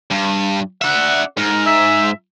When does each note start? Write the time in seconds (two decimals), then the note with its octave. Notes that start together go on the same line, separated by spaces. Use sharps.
0.11 G2
0.82 D4 E5 F#5
1.37 G#2 A#4
1.66 E5